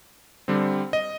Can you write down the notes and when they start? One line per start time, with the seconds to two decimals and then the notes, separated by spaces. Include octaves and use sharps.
0.48 D3 G3 C4
0.93 D#5